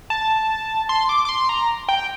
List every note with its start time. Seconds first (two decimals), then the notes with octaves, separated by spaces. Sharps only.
0.10 A5
0.89 C6
1.09 D6
1.25 D6
1.29 C6
1.49 A#5
1.89 G5